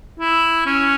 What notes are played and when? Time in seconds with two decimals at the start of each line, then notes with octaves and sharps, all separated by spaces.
0.19 E4
0.66 C#4